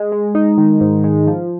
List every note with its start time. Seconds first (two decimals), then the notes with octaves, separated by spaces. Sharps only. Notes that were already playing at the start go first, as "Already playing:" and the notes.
Already playing: G#3
0.12 G#3
0.35 D#4
0.58 D#3
0.81 G#2
1.04 G#3
1.27 F3